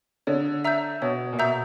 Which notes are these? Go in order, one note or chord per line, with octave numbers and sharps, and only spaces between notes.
D3 C#5
E5 A#5 E6 G6
B2 C#5
A#2
B2 E5 A#5 E6 G6